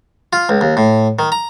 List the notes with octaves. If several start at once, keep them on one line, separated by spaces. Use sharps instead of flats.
F4
C#2
D#2
A2
D#3
A#5